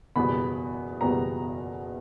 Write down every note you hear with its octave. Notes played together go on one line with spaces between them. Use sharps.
F#1 E2 B2 G3 B3 B5
F#1 E2 B2 G3 B3 A#5